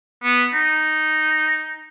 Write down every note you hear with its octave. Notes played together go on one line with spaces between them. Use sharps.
B3
D#4